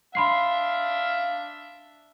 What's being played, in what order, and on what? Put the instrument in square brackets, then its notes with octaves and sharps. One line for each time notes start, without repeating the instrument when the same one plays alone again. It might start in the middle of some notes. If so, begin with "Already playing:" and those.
[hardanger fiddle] D4 E5 [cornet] F5 [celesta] B5 C6 C7